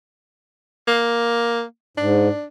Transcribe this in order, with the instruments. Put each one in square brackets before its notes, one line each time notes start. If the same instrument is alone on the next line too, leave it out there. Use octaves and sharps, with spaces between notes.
[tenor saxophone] A#3
[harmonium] G#2 [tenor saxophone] D4